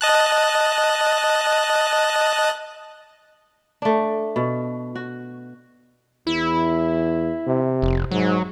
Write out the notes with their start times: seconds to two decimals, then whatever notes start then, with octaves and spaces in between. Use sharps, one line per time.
0.01 D#5 A5 F#6
3.82 A3 D4
4.36 B2
4.95 F#4
6.27 E2 E4
7.47 C3
7.82 F1
8.11 G#2 F#3